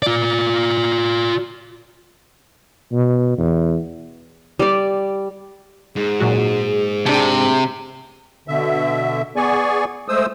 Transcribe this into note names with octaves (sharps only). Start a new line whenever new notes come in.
F4 D5
B2
E2
G3 D5
G#2 G#4
A#2 F#3 F#4
C3 D4 G4 A5
B2 D3 E5
B3 G#4 D5 G#5 C#6
G#3 A3 C5 D#6 E6